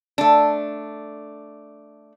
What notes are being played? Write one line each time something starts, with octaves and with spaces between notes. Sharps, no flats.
A3 D4